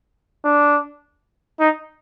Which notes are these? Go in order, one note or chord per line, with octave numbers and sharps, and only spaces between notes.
D4
D#4